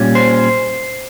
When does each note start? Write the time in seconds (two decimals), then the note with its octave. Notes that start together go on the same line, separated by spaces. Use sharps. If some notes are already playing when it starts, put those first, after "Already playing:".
Already playing: A#2 G3 C#4
0.15 C5